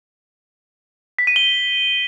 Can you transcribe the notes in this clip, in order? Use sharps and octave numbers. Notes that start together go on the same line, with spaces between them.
B6
D#7
G7